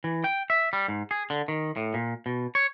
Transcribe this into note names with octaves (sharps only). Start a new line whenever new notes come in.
E3
G5
E5
G3
G#2
G#4
D3
D#3
A2
A#2
B2
C#5